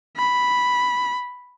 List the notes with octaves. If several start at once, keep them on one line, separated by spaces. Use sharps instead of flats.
B5